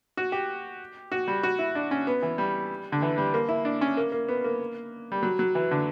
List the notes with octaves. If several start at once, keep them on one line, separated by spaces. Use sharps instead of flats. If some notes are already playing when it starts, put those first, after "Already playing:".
F#4
G4
F#4
G3
F#4
E4
D4
C#4
B3
E3
G3
D3
E3
G3
A#3
E4
D4
C#4
A#3
A#3
B3
A#3
G3
F#3
F#3
E3
D3